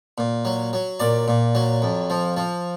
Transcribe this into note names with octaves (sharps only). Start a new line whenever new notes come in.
A#2
F#3
F#3
A#2 D5
A#2
F#3
F2
F3
F3